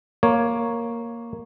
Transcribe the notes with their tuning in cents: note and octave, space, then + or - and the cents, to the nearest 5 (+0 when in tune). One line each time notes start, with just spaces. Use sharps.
A#3 +0 C#5 +0